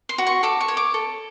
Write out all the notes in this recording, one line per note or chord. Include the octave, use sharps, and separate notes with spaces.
C6
F#4
C#6
A4 D6
C#6
C#5
D6
A4